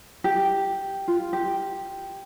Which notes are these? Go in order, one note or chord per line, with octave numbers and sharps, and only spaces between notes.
G4
F4
G4